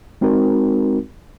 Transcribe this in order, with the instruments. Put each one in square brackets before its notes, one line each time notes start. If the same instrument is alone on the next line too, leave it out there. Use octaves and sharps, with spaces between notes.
[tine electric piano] G#3 C4 D#4 F#4 A#4